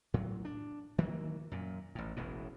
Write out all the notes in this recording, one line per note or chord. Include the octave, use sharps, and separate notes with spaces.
A2 F#3
D4
D#3 E3 F#3 A#3
F#2 A#2
A1 A2
E1 A1 B2 E3